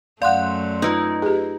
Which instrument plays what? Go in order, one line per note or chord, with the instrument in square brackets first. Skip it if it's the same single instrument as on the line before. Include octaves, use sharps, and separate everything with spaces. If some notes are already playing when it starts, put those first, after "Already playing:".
[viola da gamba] F#2 A3 [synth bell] D5 C6 F#6 [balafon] F5 F#5
[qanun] D#4 [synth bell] F4 B4 D#5
[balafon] G4 G#4